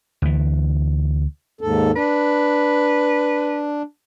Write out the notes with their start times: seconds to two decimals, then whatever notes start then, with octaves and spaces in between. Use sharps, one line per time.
0.22 D2 E3
1.61 D#2 G#2 A4
1.96 D4 B4